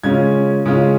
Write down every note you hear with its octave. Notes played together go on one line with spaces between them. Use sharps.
C#3 G#3 C#4 F4 G#6
C#3 G#3 C#4 F4